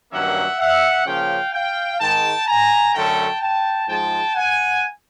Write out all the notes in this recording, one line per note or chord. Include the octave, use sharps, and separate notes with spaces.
G2 D#3 F#3 A#3 C#4 E5 F#5
E5 F#5
C#3 F3 A#3 C#4 F5 G5
F5 G5
G#2 D#3 G#3 G5 A5
G#5 A#5
F#2 D3 F#3 A3 C#4 G5 A5
G5 A5
G#2 F3 G#3 G5 A5
F#5 G#5